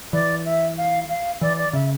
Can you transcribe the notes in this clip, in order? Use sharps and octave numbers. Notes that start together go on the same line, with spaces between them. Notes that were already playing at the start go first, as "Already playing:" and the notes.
E3 D5
E5
F5
F5
E3 D5
D5
C#3 E5